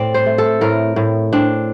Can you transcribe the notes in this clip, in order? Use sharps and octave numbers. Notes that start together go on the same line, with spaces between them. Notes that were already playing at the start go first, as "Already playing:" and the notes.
Already playing: A2 C4 D5
C5
A3
A4
A2 A#4
A2
C4 D4